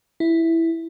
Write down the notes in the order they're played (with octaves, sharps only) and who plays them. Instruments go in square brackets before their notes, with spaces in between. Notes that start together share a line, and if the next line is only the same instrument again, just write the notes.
[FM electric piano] E4